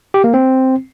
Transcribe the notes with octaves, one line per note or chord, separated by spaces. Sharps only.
G4
A#3
C4